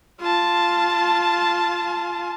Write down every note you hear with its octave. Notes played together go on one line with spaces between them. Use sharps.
F4 A5